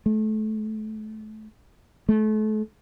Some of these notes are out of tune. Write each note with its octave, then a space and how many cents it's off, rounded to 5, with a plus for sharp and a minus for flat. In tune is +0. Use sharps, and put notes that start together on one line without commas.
A3 -25
A3 -35